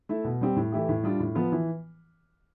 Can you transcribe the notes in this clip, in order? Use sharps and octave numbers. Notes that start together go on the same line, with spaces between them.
A3 E4
B2
G3 C4 G4
A2
E3 A3 E4 G4
A2
G3 D4 F4
A2
F3 B3 F4
E3